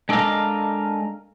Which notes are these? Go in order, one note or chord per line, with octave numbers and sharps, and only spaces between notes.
G#3 D4 A4 A#4 D#5 F5